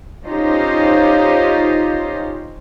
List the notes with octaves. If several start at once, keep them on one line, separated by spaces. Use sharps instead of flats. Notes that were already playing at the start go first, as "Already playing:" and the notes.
C#4 D#4 F4 G4 C5